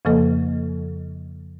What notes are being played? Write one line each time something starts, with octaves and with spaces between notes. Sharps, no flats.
F2 C#3 F3 A#3 A4 D#5